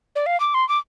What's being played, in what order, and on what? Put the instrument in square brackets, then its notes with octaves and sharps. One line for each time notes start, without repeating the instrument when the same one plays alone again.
[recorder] D5
F5
D6
C6
D6